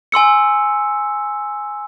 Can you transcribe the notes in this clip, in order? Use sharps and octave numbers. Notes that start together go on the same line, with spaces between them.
G#5 C6 E6 C#7